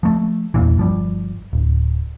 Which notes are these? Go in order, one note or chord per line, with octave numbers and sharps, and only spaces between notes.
F3 A3
E2 A#2 E3
G1 F3 G3
D1